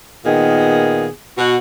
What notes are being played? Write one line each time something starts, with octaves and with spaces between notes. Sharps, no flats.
A#2 D#3 B3 G#4
B2 F#4